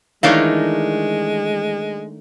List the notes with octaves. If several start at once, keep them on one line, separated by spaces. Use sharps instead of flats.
D#3 E3 G#3 A3 D4 A#4 C#5 F5